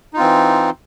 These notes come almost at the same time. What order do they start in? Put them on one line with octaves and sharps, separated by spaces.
D#4 F4 C4 E3